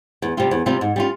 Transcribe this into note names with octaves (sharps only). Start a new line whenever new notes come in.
E2
C3 G3 C4 F4
E2
C3 G3 C4 F4
G#2
G3 C#4 F4